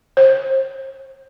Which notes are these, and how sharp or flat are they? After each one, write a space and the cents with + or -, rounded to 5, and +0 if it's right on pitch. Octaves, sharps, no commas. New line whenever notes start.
C5 +40